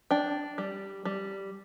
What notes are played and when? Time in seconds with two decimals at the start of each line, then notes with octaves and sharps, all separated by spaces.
0.11 D4 G5
0.58 G3
1.05 G3